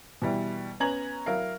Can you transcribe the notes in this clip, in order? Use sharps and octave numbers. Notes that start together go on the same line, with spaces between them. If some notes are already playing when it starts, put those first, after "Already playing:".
B2 E3 G3 E4
B3 C#4 A#5 G#6 F#7
F#3 E4 A#4 F5